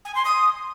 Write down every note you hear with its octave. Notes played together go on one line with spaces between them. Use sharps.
G#5
C6
D#6